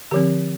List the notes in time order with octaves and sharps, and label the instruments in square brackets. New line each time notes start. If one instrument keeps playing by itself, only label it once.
[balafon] D3 F3 C4 G4